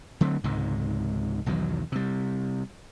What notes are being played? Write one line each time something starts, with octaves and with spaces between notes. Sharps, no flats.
D3 F#3 A3 C4
C#2 G#2 C3 D#3
B1 E2 D#3 F#3
C3 G3